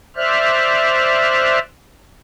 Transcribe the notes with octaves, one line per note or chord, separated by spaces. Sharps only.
C5 D5 E5 F6 F#6